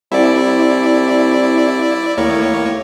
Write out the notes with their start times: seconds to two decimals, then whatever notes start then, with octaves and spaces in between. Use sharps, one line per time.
0.12 C2 E4 D5
2.17 D#2 A2 A#3 C#5